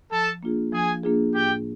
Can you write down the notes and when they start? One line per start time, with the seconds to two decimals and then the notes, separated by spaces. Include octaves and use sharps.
0.12 F3 A4 A5
0.43 A#3 D4 F4 G#4
0.72 F3 G#4 G#5
1.03 A#3 D4 F4 G#4
1.34 A2 G4 G5